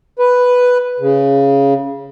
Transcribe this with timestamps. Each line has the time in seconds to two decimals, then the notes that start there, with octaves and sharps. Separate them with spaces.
0.19 B4
1.00 C#3